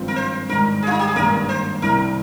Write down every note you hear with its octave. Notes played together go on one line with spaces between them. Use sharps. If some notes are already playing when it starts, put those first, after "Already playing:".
Already playing: G#1 G2 F3 C4 F4
A#4
C5
G#2 D#3 G3 A#4
G#4
F4
D#4
G4
G#4
G#1 G2 D#3 G3 A#3 A#4
C5
C2 C3 G3 A#4